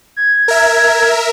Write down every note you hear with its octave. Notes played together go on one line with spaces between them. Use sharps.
G#6
A#4 E5